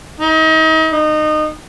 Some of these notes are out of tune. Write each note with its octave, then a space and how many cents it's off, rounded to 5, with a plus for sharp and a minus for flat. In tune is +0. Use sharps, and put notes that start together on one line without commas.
D#4 +35
D#4 -25